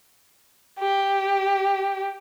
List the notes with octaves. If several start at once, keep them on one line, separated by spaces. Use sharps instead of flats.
G4